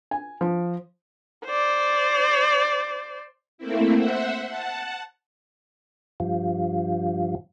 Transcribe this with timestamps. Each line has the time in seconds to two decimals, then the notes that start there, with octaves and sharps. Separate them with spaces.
0.11 G#5
0.41 F3
1.45 C5 D5
3.58 A3 A#3 C4 E4
3.96 C5 E5 F#5
4.47 F#5 A5
6.20 G2 F3